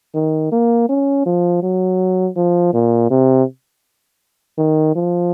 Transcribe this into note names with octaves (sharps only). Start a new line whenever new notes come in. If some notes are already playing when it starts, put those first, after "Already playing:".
D#3
A#3
C#4
F3
F#3
F3
A#2
C3
D#3
F3